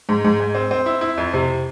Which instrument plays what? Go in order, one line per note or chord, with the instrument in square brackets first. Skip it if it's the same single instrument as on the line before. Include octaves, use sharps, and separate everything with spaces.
[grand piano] G#2
G#2
G#2
C4
C4
E4
E4
F2
C3